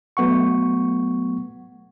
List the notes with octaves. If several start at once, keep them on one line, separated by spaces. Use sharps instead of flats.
F#3 A3 B3 F#5 C#6